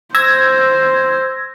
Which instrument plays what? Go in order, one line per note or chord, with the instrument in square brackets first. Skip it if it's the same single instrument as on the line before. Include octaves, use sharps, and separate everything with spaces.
[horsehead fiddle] C5 [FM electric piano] E6 G#6 A#6